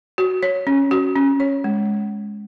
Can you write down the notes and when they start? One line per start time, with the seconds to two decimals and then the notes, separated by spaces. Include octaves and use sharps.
0.18 F#4
0.43 C#5
0.67 C#4
0.91 F#4
1.16 C#4
1.40 C#5
1.64 G#3